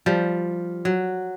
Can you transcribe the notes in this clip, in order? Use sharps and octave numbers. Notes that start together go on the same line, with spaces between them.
F3 G3
F#3